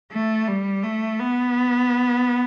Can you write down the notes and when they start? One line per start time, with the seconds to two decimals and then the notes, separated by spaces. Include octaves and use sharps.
0.12 A3
0.47 G3
0.83 A3
1.19 B3